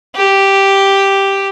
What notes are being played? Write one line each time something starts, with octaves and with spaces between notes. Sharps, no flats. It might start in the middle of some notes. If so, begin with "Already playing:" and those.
G4